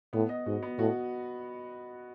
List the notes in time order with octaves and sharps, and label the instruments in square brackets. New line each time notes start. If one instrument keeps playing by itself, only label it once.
[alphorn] A2 [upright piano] B3
[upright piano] D#5
[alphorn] G#2 [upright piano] F#4
[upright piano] B3
[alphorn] A2 [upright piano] F#4